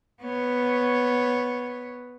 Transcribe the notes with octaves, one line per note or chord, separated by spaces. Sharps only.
B3 C#5